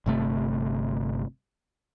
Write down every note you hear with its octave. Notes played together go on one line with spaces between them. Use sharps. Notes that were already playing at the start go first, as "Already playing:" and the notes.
G1 C3 A3